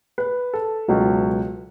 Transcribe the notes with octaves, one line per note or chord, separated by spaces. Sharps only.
B4
A4
C#2 B2 F#3